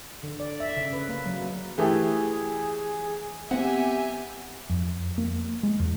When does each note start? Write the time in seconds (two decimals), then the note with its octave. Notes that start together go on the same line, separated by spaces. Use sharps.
0.23 D3
0.40 D5
0.60 E5
0.77 C#3
0.93 B4
1.09 A#3
1.26 F#3
1.78 E3 A3 G4 G#4
3.51 B3 C4 G4 E5 F#5 G#5
4.70 F2
5.18 A#3
5.63 G#3
5.80 E2